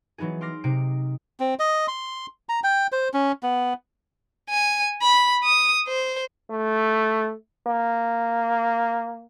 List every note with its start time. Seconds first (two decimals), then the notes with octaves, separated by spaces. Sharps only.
0.18 E3 F#3 B3 D#4 G#4
0.41 C6 D6 F6 A#6 C7
0.64 C3 D#4 C7 D7
1.40 C4
1.59 D#5
1.88 C6
2.49 A#5
2.64 G5
2.92 C5
3.14 C#4
3.43 B3
4.49 G#5
5.02 B5
5.44 D#6
5.87 C5
6.50 A3
7.67 A#3